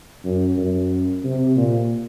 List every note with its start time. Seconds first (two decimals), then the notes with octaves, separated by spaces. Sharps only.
0.25 F#2
0.58 F#2
1.24 C3
1.56 A#2